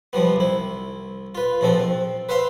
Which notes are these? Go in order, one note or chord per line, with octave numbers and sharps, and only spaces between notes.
C3 F3 G3 B3
C2 E4
F4 B4
A#1 B2 F3 C4 A4
C4
B4 C5 E5 F5 C6